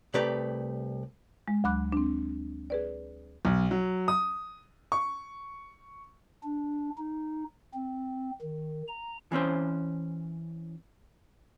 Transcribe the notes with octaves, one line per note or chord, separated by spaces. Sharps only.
C2 A3 G4 B4 D5 A#5
G#3
D2 F#3 B5 D6 F#6
C4 D4
G#4 B4 D5
B1
F#3
D#6
C#6
D4
D#4
C4
D#3
A#5
E3 C4 C#4 C5